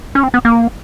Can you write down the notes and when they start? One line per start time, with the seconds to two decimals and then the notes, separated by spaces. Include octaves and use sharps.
0.15 C#4
0.23 C4
0.34 B3
0.45 A#3